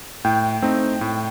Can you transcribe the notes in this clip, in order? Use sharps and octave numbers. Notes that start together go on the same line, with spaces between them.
A2 G5
A3 C4 D#4
A2